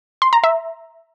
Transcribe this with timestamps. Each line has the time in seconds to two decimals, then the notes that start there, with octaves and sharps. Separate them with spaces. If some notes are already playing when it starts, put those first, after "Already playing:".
0.22 C6
0.33 A#5
0.44 E5